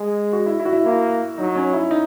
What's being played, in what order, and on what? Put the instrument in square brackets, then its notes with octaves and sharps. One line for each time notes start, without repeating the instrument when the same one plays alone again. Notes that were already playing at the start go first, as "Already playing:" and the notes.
Already playing: [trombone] G#3 [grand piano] G#4
[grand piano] F#4
E4
E4
F#4
E4
[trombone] A#3 [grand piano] E4
[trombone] F#3 [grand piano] D#4
[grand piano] C#4
E4
D#4